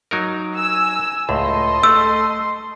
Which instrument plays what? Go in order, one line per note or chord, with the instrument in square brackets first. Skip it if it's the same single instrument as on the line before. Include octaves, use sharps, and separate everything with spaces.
[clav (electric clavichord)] F#3 D#4 A#4
[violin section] G#5 E6
[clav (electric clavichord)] C#2 A2 [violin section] A4 D#5 [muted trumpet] C6
[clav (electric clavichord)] A3 [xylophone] E6